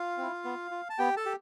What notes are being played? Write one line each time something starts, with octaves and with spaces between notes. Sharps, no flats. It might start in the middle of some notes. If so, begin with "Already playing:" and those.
Already playing: F4 F5
C4 E4
B3
F4
A5
B3 G4 G5
A4 A5
G4